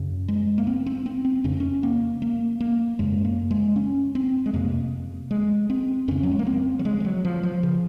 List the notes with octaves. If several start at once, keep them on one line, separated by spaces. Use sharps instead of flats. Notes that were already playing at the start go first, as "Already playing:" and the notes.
Already playing: F#2 C#3
G#3
A#3
C4
C4
C4
C4
F2 C#3 C#4
C4
C#4
A#3
A#3
A#3
F#2 C#3 G#3
A#3
G#3
C#4
C4
G#3
F2 C3 A#3
G#3
C4
F2 C#3 C#4
F#3
G#3
A#3
C4
F#3
G#3
F3
F#3
F3
F3
C#3